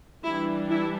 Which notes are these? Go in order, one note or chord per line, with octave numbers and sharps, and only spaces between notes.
E3 G3 D4 E4
E4